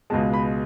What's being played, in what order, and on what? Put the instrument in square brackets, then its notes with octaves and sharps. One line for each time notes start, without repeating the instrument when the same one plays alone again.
[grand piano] C#2 B2 G#3 A5
B5